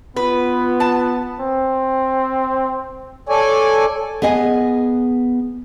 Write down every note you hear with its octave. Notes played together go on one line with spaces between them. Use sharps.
B3 F4 B4
A5
C4
A4 C#5 D5 G#5
B3 G#4 D#5 G#5